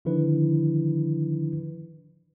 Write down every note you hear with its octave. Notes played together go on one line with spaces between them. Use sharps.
D3 D#3 F3 D4 E4 B4